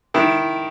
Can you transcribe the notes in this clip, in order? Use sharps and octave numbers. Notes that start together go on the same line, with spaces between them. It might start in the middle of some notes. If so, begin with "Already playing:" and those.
D#3 E4